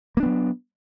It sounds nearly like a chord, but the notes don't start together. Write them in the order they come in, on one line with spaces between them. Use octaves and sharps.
A#3 D4 B3 F#3